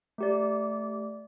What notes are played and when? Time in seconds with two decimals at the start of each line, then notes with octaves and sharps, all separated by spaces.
0.18 A3 G4 D5